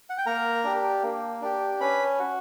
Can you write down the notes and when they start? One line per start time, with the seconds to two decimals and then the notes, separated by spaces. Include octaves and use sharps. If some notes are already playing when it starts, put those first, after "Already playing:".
0.10 F#5
0.18 G5
0.26 A#3 A#4 A#5
0.64 D4 G4
1.03 A#3
1.41 D4 G4
1.80 C#4 B4 B5
2.19 F#4